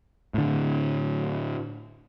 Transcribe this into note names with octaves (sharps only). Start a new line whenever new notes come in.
A2 D3